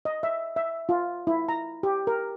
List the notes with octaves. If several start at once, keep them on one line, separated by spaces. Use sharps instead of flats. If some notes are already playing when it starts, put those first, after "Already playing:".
D#5
E5
E5
F4
E4
A#5
G4
A#4